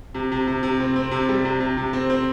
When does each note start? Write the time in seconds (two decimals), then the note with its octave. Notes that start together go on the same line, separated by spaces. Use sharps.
0.14 C3
0.32 C3
0.47 C3
0.63 C3
0.80 C4
0.96 C4
1.11 C3
1.29 G3
1.45 C3
1.60 C3
1.77 C3
1.93 C4
2.10 C4